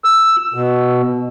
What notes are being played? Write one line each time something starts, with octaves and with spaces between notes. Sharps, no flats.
E6
B2